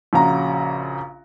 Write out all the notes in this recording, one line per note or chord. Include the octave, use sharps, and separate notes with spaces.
A#1 C#3 F#4 A#5